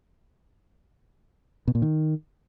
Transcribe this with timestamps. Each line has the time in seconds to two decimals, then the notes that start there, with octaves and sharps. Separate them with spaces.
1.68 B2
1.75 A#2
1.82 D#3